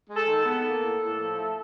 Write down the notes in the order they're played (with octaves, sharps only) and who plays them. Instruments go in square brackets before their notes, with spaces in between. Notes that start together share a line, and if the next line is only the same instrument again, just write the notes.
[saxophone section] G#3
A4
D#3
B3 A4
A#3
A2
A2
F3
A3